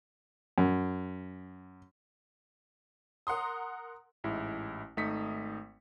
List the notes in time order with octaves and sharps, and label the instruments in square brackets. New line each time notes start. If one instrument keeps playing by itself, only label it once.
[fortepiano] F#2
[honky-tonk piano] A#4 F#5 A#5 C6 D#6
[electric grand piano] A1 G#2 E4
G#1 A3 D#4 D#6 B6 C#7